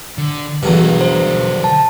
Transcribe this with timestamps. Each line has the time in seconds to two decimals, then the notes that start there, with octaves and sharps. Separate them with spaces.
0.18 D3
0.63 B1 E2 G2 D3 A#4
1.01 C5
1.64 A5